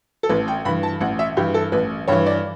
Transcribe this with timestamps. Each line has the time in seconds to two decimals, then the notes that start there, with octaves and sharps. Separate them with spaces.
0.23 A4
0.29 A1 B4
0.48 G5
0.65 G2 B5
0.68 E3
0.83 A5
1.00 A1 F#5
1.19 E5
1.37 G2 E3 G4
1.54 A4
1.72 A1 B4
2.08 G2 E3 C#5
2.26 D5